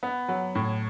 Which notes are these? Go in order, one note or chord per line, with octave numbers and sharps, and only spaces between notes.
B3
F#3
A2